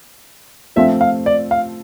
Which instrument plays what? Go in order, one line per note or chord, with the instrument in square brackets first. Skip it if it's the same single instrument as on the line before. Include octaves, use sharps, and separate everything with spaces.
[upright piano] F3 A3 C4 F4 [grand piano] E5
[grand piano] F5
D5
F5